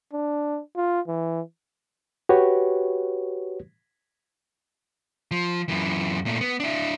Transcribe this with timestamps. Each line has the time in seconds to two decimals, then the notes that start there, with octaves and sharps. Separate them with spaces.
0.13 D4
0.76 F4
1.07 E3
2.29 F#4 G4 B4 C#5
5.31 F3
5.68 F#2 E3
6.26 A#2 A3
6.41 B3
6.60 D4 E4